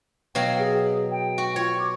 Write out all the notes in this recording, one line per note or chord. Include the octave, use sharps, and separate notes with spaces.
B2 F#3 F5 G5
G#4
G5
F#4
F4 C#5
D6